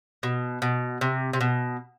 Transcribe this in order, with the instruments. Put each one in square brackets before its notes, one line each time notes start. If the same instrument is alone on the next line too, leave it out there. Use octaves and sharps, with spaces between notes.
[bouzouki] B2
B2
C3
C3
B2